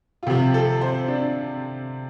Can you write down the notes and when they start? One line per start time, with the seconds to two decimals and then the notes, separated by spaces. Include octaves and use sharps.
0.23 F4
0.27 C3 F3 G4
0.54 A4
0.81 C5
1.08 D4